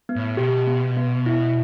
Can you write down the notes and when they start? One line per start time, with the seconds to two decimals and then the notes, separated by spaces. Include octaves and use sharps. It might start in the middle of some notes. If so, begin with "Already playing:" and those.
0.09 B3
0.16 A2
0.37 B2 G4
0.67 B3
0.97 B3
1.26 E4